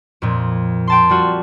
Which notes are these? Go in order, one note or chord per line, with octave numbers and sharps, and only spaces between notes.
F2 A#2
G5 A5 C6
G3 F4 F#4